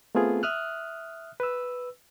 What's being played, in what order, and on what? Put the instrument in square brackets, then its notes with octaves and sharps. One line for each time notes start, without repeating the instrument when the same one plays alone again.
[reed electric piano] A3 B3 C4 F4 G#4
E5 D#6 F6 F#6
B4 E6